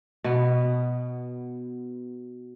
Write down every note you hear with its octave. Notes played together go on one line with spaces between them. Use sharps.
B2 B3